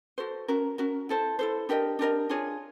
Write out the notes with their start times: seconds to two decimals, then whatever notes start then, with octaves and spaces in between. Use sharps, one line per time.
0.18 F#4 A4 C5
0.48 C#4 F#4 A#4
0.78 C#4 F#4 A#4
1.09 E4 A4 C5
1.39 E4 A4 C5
1.69 D4 G4 A#4 D#5
1.99 D4 G4 A#4 D#5
2.29 D4 F4 G#4 C#5